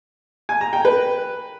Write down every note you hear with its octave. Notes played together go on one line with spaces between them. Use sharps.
G#5
A#5
G5
B4